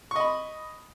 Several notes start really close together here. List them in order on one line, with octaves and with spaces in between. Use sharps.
C#6 D#5 B5